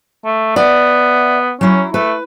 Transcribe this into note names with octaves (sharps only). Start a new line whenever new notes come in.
A3
B3 D5 E5 F#5
F#3 C#4 E4
A3 B4